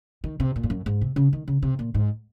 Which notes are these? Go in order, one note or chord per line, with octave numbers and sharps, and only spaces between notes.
D#3
C3
A#2
G#2
F#2
G#2
C3
C#3
D#3
C#3
C3
A#2
G#2